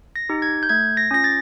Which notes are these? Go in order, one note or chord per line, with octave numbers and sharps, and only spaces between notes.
A#6
D#4 G4
G#6
G6
A3 G#6
A#6
C#4 F4 A#6
A6